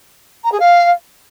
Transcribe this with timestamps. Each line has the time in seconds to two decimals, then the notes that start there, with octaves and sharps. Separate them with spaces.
0.43 A#5
0.51 G#4
0.60 F5